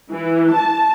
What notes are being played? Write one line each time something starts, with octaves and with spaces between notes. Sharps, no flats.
E3
A5